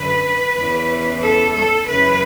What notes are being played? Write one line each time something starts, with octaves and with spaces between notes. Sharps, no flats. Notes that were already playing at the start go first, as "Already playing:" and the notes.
Already playing: F#2 D3 B4
E2 C#3 E3
A4
A4
F#2 C#3 E3 B4